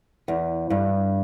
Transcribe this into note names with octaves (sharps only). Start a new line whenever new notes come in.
E2
G2